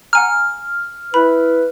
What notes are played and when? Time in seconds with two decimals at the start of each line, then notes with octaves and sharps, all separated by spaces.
0.13 F#5 G#5 A#5 F6
1.14 E4 B4 B5